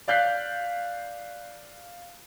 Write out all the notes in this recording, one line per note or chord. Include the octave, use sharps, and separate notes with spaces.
D5 F5 F#6 G6 B6 C7